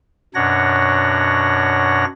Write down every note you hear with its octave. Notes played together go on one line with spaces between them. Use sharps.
F#2 B2 D4 C#5 F#5 A#6